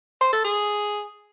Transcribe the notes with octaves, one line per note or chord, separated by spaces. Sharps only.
C5
A4
G#4